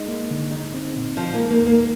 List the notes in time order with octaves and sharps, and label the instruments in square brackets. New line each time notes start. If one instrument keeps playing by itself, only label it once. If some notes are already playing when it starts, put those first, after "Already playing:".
Already playing: [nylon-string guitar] G#3 [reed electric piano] D#4
[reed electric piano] A#3
D3
D#4
C4
A#2
[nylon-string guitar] F3 [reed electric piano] D#4
[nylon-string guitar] A#3
[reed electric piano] G#3
[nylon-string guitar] A#3
[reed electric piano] D#2
[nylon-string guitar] A#3